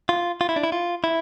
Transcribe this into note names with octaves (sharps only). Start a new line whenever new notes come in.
F4
F4
E4
D4
E4
F4
E4